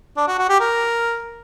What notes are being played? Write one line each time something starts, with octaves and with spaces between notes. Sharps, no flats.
D4
F#4
F#4
G4
A#4